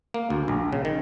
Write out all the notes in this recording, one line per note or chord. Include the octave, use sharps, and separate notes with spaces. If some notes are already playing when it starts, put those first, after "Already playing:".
A#3
D2
A#1
C#3
D#3